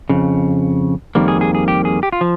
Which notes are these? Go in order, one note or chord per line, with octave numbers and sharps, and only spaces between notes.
F2 C#3
F2 D#3 G3 A#3
G#4
G#4
G#4
G4
G#4
G4
F4
F3